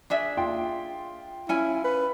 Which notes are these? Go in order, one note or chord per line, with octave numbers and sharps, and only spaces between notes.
D4 G#4 E5
F4 G5 C6
C#4 E4 G#5
B4